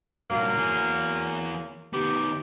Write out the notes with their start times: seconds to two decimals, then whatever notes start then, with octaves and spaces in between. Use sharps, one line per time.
0.31 G2 A#2 F#3 A#3
0.57 E3 G#4
1.93 D#3 B3 G4